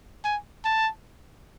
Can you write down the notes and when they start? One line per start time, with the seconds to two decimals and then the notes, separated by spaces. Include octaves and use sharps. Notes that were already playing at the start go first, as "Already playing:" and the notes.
0.24 G#5
0.64 A5